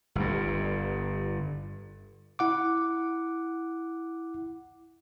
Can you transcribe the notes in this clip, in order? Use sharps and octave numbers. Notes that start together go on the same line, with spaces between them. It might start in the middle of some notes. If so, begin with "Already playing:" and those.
G1 G2
E4 F#5 D6